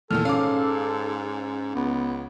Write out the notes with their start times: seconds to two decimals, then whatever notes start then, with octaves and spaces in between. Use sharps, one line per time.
0.11 E2 A#2 D#3 A4 F6
0.25 G#2 C#4 F5 D6
1.75 C#2 B3